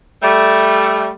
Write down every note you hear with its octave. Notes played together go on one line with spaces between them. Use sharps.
G3 A3